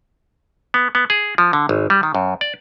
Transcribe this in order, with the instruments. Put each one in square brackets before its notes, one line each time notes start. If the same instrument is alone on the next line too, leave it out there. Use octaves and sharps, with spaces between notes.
[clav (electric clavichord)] B3
B3
G#4
F3
D3
G#1
G3
D#3
F#2
D5